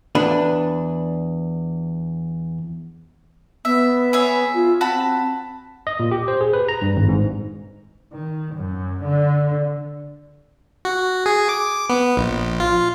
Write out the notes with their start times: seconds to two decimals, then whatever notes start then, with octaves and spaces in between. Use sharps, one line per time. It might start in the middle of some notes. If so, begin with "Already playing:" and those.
0.15 E2 D4 B4
3.65 B3 E5
4.13 G#4 C#5 E5
4.55 F4
4.81 C4 F#4 A5 B5
5.87 D#5
6.00 A#2
6.11 G4
6.28 C5
6.41 G#4
6.53 B4
6.68 A#5
6.82 G2
6.96 G#1
7.09 G#2
8.13 D#3
8.55 F#2
9.03 D3
10.85 F#4
11.26 G#4
11.49 D6
11.90 B3
12.17 A#1
12.60 F4